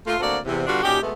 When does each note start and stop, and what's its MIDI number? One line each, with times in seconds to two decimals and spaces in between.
0.07 0.15 57
0.07 0.15 58
0.07 0.15 65
0.20 0.37 38
0.20 0.37 58
0.20 0.37 60
0.20 0.37 66
0.20 0.37 69
0.20 0.37 74
0.45 0.65 40
0.45 0.65 48
0.66 0.80 50
0.66 0.80 55
0.66 0.80 59
0.66 0.80 62
0.66 0.80 65
0.66 0.80 66
0.83 0.99 46
0.83 0.99 61
0.83 0.99 63
0.83 0.99 66
0.83 0.99 67
1.02 1.11 47
1.02 1.11 56
1.02 1.11 57
1.02 1.11 59